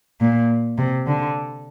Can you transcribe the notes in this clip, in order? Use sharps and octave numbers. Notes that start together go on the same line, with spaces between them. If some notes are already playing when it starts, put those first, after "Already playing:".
A#2
C3
D3